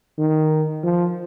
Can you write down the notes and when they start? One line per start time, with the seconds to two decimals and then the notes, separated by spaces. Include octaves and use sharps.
0.18 D#3
0.84 F3